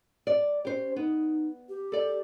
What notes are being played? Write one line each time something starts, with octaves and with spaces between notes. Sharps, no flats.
D5
C#4 G4 C5
B3 D#4
G4
A4 D5